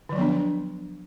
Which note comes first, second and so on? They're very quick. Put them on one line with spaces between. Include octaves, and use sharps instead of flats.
D3 F#3 F3 B3 D4